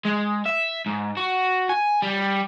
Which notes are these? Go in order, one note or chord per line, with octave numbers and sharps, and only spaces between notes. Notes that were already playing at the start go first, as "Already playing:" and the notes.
G#3
E5
G#2
F#4
G#5
G3